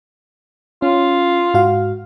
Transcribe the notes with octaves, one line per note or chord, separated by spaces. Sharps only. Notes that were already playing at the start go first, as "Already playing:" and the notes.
C#4 F4
G#2 F#4 F5